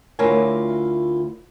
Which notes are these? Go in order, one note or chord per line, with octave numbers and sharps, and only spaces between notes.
D2 E4 F4 A#4 C#5 G#5